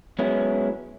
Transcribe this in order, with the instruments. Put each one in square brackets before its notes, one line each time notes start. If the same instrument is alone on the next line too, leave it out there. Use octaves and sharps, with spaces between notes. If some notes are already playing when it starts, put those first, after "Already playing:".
[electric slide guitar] F#3 G#3 B3 C#4 E4